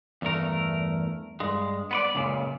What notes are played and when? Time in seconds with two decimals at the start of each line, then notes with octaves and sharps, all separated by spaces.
0.22 E2 G2 A3 A#4
1.40 G2 G#3
1.91 B3 B4 D5
2.15 C#2 F#2 A#2 C#3